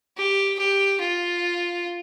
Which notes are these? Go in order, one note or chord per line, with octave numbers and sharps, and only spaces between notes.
G4
G4
F4